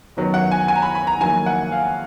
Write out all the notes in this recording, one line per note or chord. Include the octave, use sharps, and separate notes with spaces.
F#2 D#3 F#3 B3
F#5
G#5
G#5
A#5
B5
B5
A#5
F2 D#3 F#3 A#3 G#5
F#5
F5